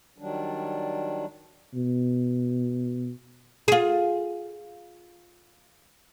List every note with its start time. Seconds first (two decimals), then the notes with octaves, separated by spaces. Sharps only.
0.18 D#3 F#3 G3 D4
1.75 B2
3.68 F4 G#4